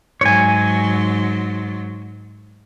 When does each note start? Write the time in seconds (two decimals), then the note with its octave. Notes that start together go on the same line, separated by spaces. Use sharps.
0.21 G#2 F#3 C#5 G#5